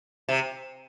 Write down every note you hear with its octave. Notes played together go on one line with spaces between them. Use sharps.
C3